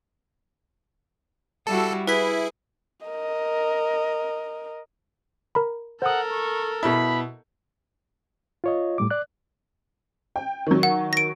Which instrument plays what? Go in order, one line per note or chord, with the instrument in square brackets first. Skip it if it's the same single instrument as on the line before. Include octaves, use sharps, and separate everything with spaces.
[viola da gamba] G3 E4 F#4 [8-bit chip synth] A4
[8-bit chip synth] E4 [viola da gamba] G#4 [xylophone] B4 B6
[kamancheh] A#4 D#5
[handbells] A#4 A#5 B5
[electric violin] A4 A#4 [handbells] C5 D#6 [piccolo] F#5
[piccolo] C#6
[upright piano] B2 E4 [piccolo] B5
[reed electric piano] F4 C#5 D#5
A2 G3 D6
D5 F#6
[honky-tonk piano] G5
D#3 F#3
[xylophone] F#5
A#6 D7